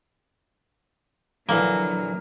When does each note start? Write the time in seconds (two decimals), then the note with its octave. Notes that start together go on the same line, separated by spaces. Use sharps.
1.49 A#1 D3 E3 F#3 A#3